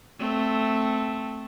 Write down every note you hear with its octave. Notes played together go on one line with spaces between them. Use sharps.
A3 C4